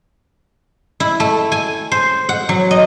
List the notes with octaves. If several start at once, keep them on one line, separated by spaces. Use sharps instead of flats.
E4
A3
G#5
C5
F#5
F#3
D#5